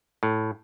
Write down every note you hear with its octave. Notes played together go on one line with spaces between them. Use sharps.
A2